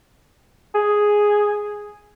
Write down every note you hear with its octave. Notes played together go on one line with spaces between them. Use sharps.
G#4